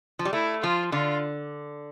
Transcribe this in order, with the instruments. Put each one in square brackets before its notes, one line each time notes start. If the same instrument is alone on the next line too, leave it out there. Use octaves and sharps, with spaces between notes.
[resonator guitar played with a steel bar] F3
G3
[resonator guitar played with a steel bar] A3 [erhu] E4
[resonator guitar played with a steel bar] F3 [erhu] F4
[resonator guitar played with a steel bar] D3 [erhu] F4